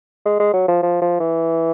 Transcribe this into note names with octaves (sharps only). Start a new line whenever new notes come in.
G#3
G#3
F#3
F3
F3
F3
E3